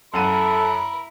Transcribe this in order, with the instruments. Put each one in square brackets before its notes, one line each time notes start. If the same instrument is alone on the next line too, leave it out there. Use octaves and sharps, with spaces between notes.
[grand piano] F#2 F#5 D#7 [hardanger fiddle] E4 A#4 [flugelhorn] A4 [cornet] B5